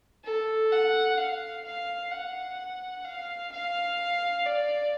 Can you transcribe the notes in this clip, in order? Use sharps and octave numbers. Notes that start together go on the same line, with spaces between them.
A4
F#5
F5
F5
F#5
F5
F5
D5